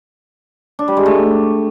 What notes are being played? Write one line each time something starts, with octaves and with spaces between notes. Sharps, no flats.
D4
G3
G#3
A3